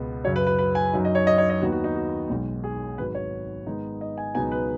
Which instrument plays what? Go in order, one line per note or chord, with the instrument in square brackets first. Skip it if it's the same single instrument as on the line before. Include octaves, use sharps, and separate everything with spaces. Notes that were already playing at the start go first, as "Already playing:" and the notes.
Already playing: [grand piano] C#2 B2 B3
F#2 C#3 F#3 C#5
B4
B4
B4
G#5
F#2 F#3 D#4
D#5
C#5
D#5
C#5
D#5
D#2 D#3 B3 D#4 F#4
F#4
D#4
F#4
B1 B2 G#3
G#4
G#1 G#2 F#3 B4
C#5
G#2 D#3 G#3 B3 D#4
D#5
G#5
C#2 B2 F#3 B3 D#4 G#5
B4